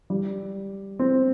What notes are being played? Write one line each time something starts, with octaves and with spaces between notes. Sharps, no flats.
G3
C4